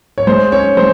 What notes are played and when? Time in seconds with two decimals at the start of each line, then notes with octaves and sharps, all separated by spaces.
0.18 C#5
0.27 G#3 C5
0.52 C#4 C#5
0.77 G#3 C5